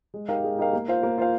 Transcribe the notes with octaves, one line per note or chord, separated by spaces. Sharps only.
G#3
D#4 G4 A#4 F5
G#3
D#4 G4 A#4 F5
A#3
F4 C5 F5
A#3
F4 C5 F5